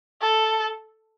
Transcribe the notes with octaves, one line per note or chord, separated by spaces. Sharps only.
A4